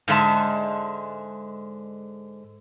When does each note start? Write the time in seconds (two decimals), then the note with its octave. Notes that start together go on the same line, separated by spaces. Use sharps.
0.08 G#2 D3 G#3 E5 A5